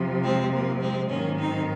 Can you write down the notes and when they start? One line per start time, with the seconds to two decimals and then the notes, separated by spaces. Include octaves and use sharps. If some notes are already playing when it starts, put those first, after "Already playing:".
Already playing: F2 C3 F3
0.23 G#3 C4
0.52 A#3
0.81 G#3 C4
1.10 G#2 D#3 F#3 A#3 C#4
1.39 C4 D#4